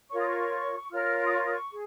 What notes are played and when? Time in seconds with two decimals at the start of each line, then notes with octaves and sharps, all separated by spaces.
0.10 F4 A#4 C#5 C#6
0.18 D#6
0.26 C#6
0.91 F4 A#4 C#5 F6
1.17 F6
1.24 D#6
1.32 C#6
1.46 D#6
1.51 C#6
1.71 G#4